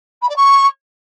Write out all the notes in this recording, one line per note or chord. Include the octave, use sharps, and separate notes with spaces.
B5
D5
C#6